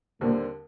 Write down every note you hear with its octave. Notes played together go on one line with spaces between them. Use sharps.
D#2 A#2 D3 G3 A#3 C4